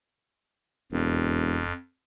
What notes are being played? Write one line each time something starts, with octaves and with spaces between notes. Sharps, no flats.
E1 F2